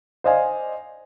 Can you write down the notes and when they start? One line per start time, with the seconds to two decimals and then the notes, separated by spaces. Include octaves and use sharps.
0.24 C5 D5 D#5 F5 G#5